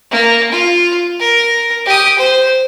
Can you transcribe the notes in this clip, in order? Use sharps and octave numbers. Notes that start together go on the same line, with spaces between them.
A#3
F4
A#4
G4 D#6
C5